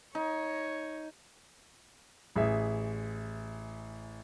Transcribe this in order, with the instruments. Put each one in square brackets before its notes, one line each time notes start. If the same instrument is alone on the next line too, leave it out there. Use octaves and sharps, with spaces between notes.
[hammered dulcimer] D#4 [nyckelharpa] C#5
[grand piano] A1 G#4 E5